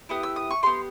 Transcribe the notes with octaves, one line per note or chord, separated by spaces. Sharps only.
B3 E4 G4 D#6
E6
D#6
C#6
B3 E4 G4 C6